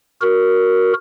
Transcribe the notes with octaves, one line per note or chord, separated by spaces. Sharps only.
F#4 A#4